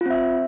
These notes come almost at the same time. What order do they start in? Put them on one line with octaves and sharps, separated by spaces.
F4 C4 E5